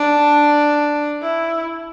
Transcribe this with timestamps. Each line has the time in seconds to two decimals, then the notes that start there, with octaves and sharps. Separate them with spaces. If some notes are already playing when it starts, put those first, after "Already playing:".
Already playing: D4
1.22 E4